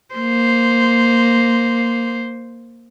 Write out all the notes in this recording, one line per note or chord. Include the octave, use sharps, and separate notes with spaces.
A#3 C5